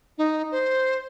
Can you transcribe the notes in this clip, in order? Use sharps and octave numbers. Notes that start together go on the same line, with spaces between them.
D#4
C5